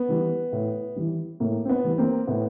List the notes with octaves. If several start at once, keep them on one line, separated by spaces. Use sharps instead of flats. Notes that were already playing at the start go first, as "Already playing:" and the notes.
Already playing: B3
E3 G3
A2
E3 G3
A2 A#3
C4
B3
E3 G3
A#3 C4
A2 B3